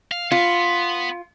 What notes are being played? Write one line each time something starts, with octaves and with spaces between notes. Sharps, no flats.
F5
B3 F4